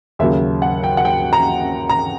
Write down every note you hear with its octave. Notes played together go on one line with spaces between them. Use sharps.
D#2 C#3 F#3 E5
F#5
G5
F#5
G5
A#5
A#5